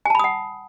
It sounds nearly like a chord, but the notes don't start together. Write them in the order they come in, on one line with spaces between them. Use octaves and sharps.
G#5 A5 B5 D#6 F#5